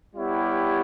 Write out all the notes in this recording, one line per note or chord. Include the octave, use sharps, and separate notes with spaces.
G3 B3 E4 G4 C#5